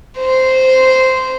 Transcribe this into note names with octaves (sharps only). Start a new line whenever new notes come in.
C5